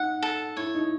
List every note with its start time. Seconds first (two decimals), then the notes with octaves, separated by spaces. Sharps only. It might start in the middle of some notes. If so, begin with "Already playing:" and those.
Already playing: D#4 F#5
0.23 A4
0.57 E4 C#5
0.75 D#4